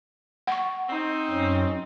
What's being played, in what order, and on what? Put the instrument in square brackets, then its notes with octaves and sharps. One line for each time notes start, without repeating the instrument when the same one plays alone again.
[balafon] F#5 C#6
[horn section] C4 D#4
[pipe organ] F#2 C#4